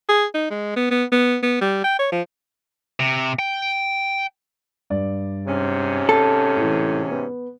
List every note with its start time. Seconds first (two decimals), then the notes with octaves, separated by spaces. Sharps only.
0.09 G#4
0.34 D#4
0.50 G#3
0.76 B3
0.91 B3
1.12 B3
1.43 B3
1.61 G3
1.84 G5
1.99 C#5
2.12 F3
3.00 C3
3.39 G5
4.90 G2 D5
5.47 G#2 C3 C#4
6.09 A4
6.56 A2 E3
7.11 B3